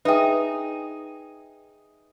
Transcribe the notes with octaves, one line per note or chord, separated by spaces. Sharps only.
D#4 G#4 B4 E5 G5